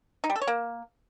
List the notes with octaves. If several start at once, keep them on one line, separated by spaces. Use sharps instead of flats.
D#4
G3
A4
C#5
A#3